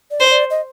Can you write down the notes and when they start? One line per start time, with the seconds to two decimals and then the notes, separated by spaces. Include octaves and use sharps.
0.11 D5
0.20 C5
0.30 D5
0.50 D#5